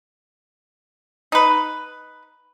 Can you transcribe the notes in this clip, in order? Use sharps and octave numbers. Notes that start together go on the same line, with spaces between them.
D#4 B4